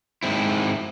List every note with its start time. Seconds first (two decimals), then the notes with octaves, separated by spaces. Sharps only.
0.23 G#2 C4 E4